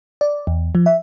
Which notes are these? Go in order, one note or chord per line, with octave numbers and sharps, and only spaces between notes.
D5
E2
F3
E5